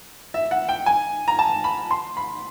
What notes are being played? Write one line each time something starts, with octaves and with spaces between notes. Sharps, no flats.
E5
F#5
G5
G#5
A#5
A5
B5
C6
B5